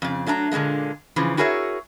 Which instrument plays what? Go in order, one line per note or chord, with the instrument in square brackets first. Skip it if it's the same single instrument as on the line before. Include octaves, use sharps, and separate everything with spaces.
[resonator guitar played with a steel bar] F2 C#3
F#3 A3 D4 A#5
A#2 D3 D#3 G#3 A#3
C#3 E3 F3
E4 F#4 G#4 A#4 C#5 E5